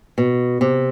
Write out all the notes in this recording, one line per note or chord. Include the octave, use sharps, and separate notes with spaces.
B2
C3